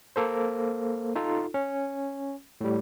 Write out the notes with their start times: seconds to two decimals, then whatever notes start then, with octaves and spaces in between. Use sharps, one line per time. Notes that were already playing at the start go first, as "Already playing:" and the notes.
0.16 A#3 A4 C5
1.15 D#4 F4 A4
1.54 C#4
2.61 A2 G3